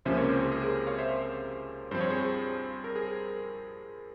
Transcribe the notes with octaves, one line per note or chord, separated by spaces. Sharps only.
C#2 C3 F3 A#3 C#4 C5 E5
A#4 C#5
G#4 C5
A#4
G#4
A#4
A#4
C#5 F5
C5 E5
G2 F3 C4 C5
C#5
G#4 C5
A#4
G#4